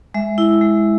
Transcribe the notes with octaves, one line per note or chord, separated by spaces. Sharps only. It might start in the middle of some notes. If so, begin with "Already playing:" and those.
G#3 E5
E4
G#3